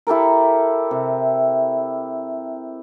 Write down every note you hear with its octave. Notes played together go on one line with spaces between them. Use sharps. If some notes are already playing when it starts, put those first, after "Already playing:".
E4 G4 A4 A#4
C3